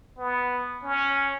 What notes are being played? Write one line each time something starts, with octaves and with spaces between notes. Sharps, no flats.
B3
C#4